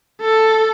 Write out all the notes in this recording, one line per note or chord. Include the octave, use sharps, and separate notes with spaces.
A4